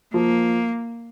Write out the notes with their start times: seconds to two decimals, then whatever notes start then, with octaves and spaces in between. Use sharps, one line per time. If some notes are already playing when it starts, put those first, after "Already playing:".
0.14 F3 A#3